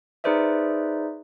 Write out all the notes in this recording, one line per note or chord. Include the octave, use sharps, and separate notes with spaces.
D#4 G#4 B4 C5 D5 E5